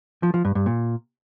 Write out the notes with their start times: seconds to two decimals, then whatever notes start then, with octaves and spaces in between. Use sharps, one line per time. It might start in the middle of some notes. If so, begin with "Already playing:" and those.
0.23 F3
0.34 F3
0.45 G2
0.55 G2
0.66 A#2